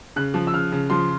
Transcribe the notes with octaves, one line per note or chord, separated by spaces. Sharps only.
C#3 F#6
F3
E6
C#3 F6
C#3
F3 C6